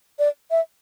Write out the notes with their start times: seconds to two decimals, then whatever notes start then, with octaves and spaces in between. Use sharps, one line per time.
0.19 D5
0.51 E5